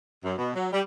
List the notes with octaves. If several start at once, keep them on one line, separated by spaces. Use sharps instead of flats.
F#2
B2
F#3
G3